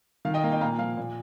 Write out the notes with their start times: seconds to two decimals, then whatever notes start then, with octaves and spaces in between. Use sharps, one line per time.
0.25 D#3 F5
0.34 D#5 G5
0.43 A#3 F5
0.52 D#5 G5
0.61 A#2 F5 A#5
0.79 F3 F5
0.97 A#2